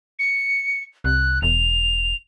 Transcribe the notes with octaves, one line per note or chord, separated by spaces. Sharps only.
C#7
C2 F#6
E1 F7